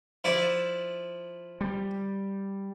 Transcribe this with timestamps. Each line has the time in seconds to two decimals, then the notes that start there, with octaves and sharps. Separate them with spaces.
0.24 F3 E4 D5
1.61 G3